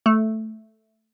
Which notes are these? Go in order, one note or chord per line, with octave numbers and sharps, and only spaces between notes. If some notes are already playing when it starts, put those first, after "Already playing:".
A3